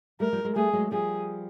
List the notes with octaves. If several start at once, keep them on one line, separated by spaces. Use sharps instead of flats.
G3 A3 A#4
F3 G3
F#3 G#3
G3 A3 G#4
F#3 G#3
F3 G3 G#4